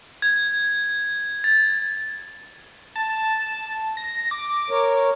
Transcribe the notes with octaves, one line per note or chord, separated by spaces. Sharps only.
G#6
A6
A5
A#6
D6
A#4 C#5